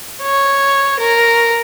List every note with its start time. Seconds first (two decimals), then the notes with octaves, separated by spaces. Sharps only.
0.22 C#5
0.99 A#4